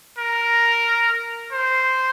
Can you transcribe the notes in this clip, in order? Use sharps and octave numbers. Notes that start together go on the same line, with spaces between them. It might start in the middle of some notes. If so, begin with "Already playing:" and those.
A#4
C5